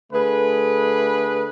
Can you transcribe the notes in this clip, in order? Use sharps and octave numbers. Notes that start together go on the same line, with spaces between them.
D3 A3 G#4 B4